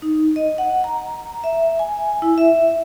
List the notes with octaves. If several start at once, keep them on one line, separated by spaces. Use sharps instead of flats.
D#4
D#5
F#5
A#5
E5
G#5
E4
E5